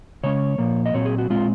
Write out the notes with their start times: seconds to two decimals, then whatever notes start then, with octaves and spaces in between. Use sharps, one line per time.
0.23 C#3 G#3 C#4 C#5
0.58 A#2 F3 A#3
0.86 D#5
0.94 A#2 F#3 C4 C#5
1.05 G#4
1.18 F#4
1.30 A#2 G#3 C4 F4